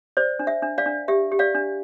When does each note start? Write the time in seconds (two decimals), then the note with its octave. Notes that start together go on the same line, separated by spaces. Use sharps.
0.17 C5 D5
0.39 D4
0.47 E5
0.62 D4
0.78 D5 F5
0.86 D4
1.08 G4 E5
1.32 G4
1.39 D5 F5
1.55 D4